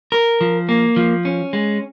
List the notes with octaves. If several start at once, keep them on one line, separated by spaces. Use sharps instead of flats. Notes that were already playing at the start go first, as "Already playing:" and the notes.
A#4
F3
A#3
F3
C#4
G#3